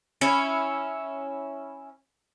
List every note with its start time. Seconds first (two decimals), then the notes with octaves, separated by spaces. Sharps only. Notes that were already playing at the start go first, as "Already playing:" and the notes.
0.21 C#4 E4